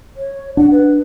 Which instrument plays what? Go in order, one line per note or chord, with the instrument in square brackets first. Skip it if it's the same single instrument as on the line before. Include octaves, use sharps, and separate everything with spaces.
[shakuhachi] C#5
[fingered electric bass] D4 [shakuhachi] F#5
[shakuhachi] B4